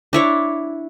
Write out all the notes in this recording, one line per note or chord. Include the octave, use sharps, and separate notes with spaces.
D4 E4 C#5